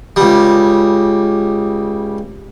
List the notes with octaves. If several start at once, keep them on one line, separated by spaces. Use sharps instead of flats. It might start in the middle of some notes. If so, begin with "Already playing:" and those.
C#2 G3